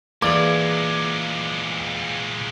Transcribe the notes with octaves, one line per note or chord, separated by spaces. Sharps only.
A#2 E3 G#3 A#3 G#4 D5 D6 G#6